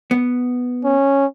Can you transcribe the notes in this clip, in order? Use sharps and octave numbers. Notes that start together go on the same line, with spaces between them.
B3
C#4